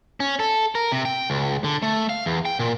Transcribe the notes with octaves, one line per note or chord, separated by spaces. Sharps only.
C#4
A4
A#4
C3
G5
C#2
D3
A3
F5
E2
G5
A#2